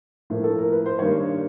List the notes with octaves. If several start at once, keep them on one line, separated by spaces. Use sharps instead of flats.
A2 F3 A#3
A4
A#4
B4
C5
G2 D#3 G3 A#3 C#5